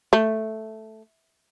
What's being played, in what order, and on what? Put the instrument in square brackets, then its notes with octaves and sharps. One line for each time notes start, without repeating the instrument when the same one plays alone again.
[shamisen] A3